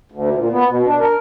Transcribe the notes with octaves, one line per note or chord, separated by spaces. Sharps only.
D2
A#2
B3
B2
D4
A#4